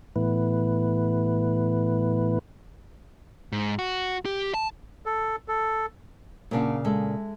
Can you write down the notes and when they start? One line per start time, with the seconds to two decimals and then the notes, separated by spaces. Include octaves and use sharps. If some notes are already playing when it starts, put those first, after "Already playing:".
0.16 A2 E3 B3
3.52 G#2
3.79 F#4
4.25 G4
4.54 A5
5.06 A4
5.48 A4
6.51 A#2 C#3 A#3 D4 F#4 F5
6.85 G#3 A4 E5